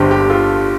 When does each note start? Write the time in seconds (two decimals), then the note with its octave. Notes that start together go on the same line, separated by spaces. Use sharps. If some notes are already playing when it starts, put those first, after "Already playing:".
Already playing: G1 G2 D3 G4 C5
0.11 G4
0.30 F4 A4